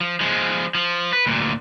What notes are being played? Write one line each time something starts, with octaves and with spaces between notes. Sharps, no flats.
F3
F3 G#3
F3
B4
D2 A#2